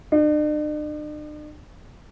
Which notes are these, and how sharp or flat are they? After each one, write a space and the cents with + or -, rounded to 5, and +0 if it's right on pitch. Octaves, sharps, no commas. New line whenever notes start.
D4 +45